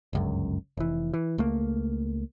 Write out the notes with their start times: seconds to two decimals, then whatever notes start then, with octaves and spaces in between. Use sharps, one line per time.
0.13 G1 C#2 F#2
0.77 F1 E3
1.14 E3
1.38 C#2 A3 A#3